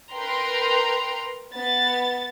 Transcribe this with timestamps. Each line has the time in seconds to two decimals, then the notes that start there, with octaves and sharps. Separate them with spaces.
0.13 A#4 B4 G5 A#5 C6
1.52 B3 A6